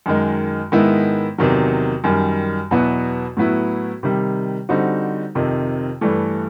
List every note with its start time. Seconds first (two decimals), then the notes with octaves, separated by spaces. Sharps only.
0.06 F#2 D#3 G#3
0.72 G#2 D#3 G#3 B3 E4
1.38 E2 C3 D#3 F#3
2.04 F#2 D#3 G3
2.71 E2 B2 F#3 B3 E4
3.37 A2 F#3 B3 E4
4.03 C3 D#3 G3
4.69 D3 G3 C4 D#4 F#4
5.35 F2 C3 D#3
6.01 G2 E3 A3